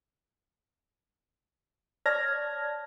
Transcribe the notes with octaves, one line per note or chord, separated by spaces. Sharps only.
C#5 D5 A5 F6 G#6 A#6